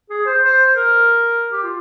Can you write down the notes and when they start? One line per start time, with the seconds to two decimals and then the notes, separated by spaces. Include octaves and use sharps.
0.10 G#4
0.26 C5
0.43 C5
0.76 A#4
1.52 G4
1.63 F4